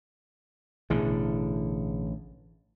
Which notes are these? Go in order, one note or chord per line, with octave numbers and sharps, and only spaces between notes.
A1 B2 D3 E4 G#4